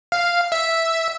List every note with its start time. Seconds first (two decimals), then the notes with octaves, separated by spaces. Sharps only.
0.12 F5
0.52 E5